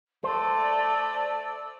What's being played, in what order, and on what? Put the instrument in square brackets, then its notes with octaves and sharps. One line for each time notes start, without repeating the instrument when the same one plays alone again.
[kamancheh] A3 [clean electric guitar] C5 [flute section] D5 E6